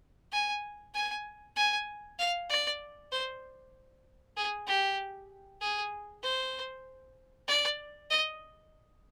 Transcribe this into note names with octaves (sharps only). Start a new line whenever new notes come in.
G#5
G#5
G#5
F5
D5
C5
G#4
G4
G#4
C5
D5
D#5